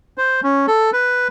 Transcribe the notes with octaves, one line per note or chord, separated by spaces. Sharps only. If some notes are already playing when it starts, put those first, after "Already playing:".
C5
C#4
A4
B4